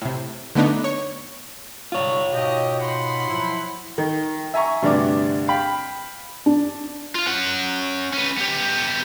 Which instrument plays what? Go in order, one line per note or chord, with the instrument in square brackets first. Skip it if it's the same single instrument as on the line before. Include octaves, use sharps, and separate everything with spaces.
[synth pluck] A2 C3
D3 A3 B3 D4 D#4
C#5
[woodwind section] G#2 C3 G3 [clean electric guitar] F4 C#5
[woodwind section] G#2 B2 [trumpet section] G4 D#5 G5
[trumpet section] F#5 B5 C6
[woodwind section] F3 F#3 E4
[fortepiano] D#3
E5 G#5 A#5 C#6
D2 G2 C3 D4 D6
F5 G5 B5
[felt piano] D4
[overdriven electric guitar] F4 F5
C#4 F#5
C#4 B4
B3 G4